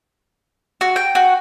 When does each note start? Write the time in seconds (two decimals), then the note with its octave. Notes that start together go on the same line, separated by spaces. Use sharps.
0.81 F#4
0.96 G5
1.15 F#4